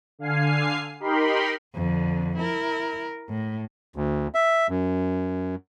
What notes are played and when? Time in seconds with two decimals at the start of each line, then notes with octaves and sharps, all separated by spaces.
0.19 D3 F5 G#5 C7
1.00 D#4 G4 A#4 B5 C6
1.75 F2 D3
2.38 E4 A#4
3.30 A2
3.96 D2
4.34 E5
4.69 F#2